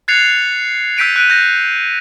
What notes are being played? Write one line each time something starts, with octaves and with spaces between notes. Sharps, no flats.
F#6 G#6 A6 C7 C#7 F7
E6 G6 B6 D7 D#7 F7
F#6 D7 D#7
G6 A#6